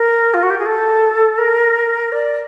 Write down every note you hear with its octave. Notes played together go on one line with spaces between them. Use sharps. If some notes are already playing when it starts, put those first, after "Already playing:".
Already playing: A#4
F4
F#4
G4
G#4
A4
A#4
D5